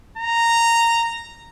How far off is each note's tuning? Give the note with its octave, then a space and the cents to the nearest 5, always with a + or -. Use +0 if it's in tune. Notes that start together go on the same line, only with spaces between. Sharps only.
A#5 -10